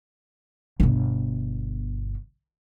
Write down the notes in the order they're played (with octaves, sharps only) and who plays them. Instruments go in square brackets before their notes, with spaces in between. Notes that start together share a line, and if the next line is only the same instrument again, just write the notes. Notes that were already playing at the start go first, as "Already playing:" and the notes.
[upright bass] G1 B2